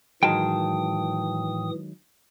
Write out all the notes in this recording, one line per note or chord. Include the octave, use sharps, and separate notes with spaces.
A2 D#3 E3 F#3 G#3 G5 A5 D#6